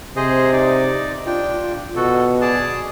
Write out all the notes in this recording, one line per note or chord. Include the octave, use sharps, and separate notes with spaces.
C3 G#4 C5 D#5
D#4 D5
D4 F4 G5
B2 F#4 A4
G#4 D5 A5